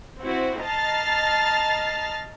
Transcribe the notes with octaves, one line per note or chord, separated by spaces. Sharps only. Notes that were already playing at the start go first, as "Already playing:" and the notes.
C4 E4 F#4
D#5 A5 A#5 F6 A6 C7